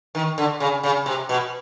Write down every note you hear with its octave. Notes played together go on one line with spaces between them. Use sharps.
D#3
D3
C#3
C#3
C3
B2